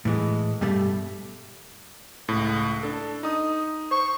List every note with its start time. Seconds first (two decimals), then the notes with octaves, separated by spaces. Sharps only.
0.05 A2 E3 G#3
0.61 G2 B2 G3 A3
2.29 C#2 A2
2.83 D4 A4
3.23 D#4 D#6
3.91 C5 C#6